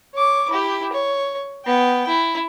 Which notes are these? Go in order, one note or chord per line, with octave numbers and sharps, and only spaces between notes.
C#5 D6
E4 G4
C#5
B3 G5
E4